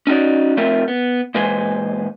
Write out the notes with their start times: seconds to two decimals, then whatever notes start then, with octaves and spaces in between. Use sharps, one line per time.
0.07 C#4 D#4 F#4 D5
0.57 F3 A3 C4 F4 A#4 E5
0.88 B3
1.35 A#2 E3 G#3 B4 C5 G#5